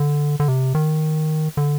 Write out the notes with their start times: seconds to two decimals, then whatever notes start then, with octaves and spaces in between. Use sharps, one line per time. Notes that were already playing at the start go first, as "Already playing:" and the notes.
Already playing: D3
0.40 D3
0.48 C3
0.75 D#3
1.57 D3